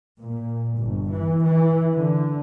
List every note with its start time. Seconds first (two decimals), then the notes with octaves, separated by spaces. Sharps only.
0.20 A#2
0.76 G1
1.10 E3
1.42 E3
1.94 D3